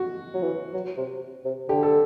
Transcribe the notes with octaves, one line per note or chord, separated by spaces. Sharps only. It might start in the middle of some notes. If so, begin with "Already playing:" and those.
Already playing: F#4
F#3
E3
F#3
C3
C3
D3 G4
A4